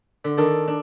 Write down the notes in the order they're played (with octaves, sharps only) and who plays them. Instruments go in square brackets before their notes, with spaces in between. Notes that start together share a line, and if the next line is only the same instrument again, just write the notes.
[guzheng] D3
D#3 D4 A4 A#4
D4